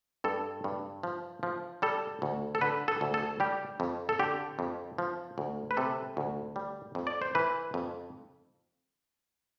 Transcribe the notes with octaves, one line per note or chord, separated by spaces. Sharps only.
G2 A4
G2
F3
F3
G3 A4
D2
A4
D3 B4
A4
D2
A4
G3 G4
F2
A4
D3 G4
F2
F3
D2
B4
C3 A4
D2
G3
F2
D5
C5
E3 B4
F2